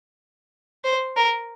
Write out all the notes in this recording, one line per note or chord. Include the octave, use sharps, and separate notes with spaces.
C5
A#4